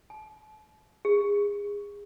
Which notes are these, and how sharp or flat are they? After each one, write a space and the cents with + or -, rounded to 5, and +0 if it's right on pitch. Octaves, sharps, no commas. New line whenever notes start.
A5 -40
G#4 -30